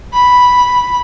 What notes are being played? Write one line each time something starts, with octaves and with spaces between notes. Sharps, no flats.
B5